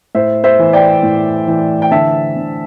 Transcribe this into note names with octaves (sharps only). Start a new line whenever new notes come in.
A2 C5 E5
C5 E5
E3
D5 G5
A2
E3
G5
D3 E5 A5
D3